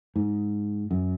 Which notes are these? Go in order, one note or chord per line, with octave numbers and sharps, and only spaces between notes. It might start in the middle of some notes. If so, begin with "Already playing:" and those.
G#2
F#2